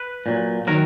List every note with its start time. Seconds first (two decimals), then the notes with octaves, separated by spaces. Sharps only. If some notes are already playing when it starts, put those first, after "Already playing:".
Already playing: B4
0.26 A#2 F#3
0.67 D#3 F#3 A#4